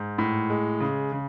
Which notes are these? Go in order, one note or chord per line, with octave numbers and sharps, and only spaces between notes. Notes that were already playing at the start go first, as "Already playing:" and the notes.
Already playing: G#2
A2
G#3
C#3
C#3